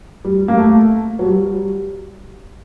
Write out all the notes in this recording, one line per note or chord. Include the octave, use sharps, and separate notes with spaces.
G3
A#3
A3
F#3
G3